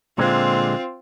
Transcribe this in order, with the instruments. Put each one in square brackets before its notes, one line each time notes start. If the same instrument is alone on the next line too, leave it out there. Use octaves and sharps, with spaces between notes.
[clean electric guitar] A#2 D3 G#3 [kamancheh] C4 F4